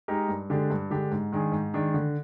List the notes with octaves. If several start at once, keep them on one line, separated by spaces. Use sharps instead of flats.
G#3 D#4 G4 A#4
G2
D3 G#3 D4 G4
G2
D3 G#3 D4 G4
G#2
D#3 G#3 D4 G#4
G#2
D#3 G#3 D4 G#4
D3